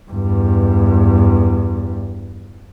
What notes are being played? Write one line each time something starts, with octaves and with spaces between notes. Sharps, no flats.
E2 G2